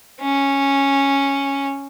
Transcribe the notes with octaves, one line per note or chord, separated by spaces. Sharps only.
C#4